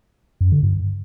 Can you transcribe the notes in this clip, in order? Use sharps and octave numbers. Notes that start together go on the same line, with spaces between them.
F#2
D3
G2